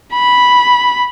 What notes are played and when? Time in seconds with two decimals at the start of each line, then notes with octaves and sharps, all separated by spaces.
0.14 B5